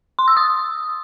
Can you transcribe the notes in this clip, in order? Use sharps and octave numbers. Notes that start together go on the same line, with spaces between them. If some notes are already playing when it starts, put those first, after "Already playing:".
C6
E6
D#6